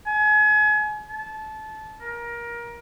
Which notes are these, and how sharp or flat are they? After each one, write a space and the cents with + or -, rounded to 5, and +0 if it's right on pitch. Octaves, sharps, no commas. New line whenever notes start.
G#5 +35
A5 -20
A#4 +20